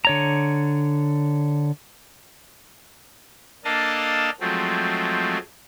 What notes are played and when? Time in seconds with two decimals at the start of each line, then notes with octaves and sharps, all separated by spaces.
0.05 D3 C#5 A#5
3.65 A#3 D4 A4 D#5 F5 A5
4.40 F3 F#3 G#3 A3 C4